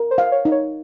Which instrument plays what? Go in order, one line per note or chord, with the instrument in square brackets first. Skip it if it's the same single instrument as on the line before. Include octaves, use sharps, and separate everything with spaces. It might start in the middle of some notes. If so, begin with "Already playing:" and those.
Already playing: [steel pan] A#4
[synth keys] C5
[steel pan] F5
[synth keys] C#5
[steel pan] D#4
[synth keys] C#5